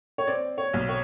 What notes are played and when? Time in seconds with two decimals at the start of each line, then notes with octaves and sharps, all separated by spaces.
0.18 C#5
0.27 C4 D5
0.58 C#5
0.74 B1
0.89 C#5